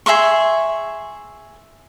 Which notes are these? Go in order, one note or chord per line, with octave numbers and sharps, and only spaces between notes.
G#4 E5 C6 C#6